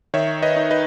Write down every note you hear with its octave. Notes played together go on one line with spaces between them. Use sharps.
D#3 C#5 E5
B4 D#5
D#4
B4 D#5